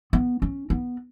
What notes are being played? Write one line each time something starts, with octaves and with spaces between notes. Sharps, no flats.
B3
C#4
B3